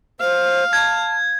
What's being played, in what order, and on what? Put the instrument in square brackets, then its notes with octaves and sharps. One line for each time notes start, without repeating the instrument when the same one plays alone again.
[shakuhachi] C5 [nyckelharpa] F5
[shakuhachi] A5 [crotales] G#6